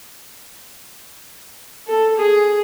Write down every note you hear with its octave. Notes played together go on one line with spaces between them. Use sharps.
A4
G#4